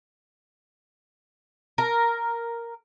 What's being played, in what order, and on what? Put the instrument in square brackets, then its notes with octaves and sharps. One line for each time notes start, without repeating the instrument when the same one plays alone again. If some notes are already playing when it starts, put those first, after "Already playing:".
[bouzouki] A#4